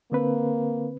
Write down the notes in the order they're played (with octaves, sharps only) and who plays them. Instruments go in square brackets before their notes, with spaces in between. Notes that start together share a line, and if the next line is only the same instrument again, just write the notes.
[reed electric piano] D3 C4 B4 [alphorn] A#3